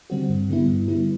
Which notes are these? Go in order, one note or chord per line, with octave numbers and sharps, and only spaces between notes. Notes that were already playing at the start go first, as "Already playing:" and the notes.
D3 G3 C4 F#4
G2
D3 G3 B3 E4
G2
D3 G3 B3 E4